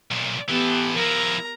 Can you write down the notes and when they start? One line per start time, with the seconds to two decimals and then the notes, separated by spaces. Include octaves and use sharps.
0.11 B1 A#2
0.49 E3 B3 G4 A4
0.97 F3 E4 A#4 A#5